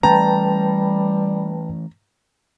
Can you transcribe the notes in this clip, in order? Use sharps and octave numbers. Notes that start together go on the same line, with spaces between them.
E3 G3 A3 C#4 B4 G5 A5 A#5